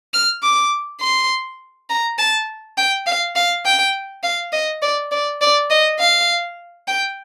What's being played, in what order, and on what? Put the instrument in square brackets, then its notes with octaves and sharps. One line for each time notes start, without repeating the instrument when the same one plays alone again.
[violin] F6
D6
C6
A#5
A5
G5
F5
F5
G5
F5
D#5
D5
D5
D5
D#5
F5
G5